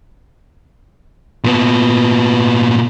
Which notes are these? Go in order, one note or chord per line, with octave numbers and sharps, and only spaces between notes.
A#2 B3